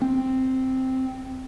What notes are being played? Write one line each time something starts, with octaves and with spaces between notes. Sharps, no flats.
C4